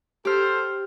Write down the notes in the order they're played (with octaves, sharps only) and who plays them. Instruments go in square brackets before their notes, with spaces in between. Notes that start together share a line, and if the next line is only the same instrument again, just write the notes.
[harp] G4 F6 [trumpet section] A4 C5